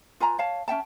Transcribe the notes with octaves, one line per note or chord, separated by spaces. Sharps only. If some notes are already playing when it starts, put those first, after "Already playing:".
F4 B4 G#5 A#5
C#5 F5 A5
C#4 E5 G5 A5